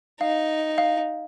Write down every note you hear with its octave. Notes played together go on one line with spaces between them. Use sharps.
D#4 F5
F5